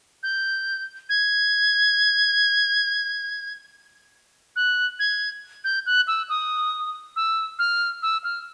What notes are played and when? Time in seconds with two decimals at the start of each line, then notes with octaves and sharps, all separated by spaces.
0.23 G6
1.09 G#6
4.56 F#6
4.99 G#6
5.64 G6
5.86 F#6
6.07 E6
6.29 D#6
7.16 E6
7.59 F6
8.02 E6
8.24 F6